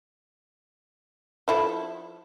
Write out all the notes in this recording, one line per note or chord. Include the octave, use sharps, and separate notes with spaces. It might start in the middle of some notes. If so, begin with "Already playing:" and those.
F3 E4 A4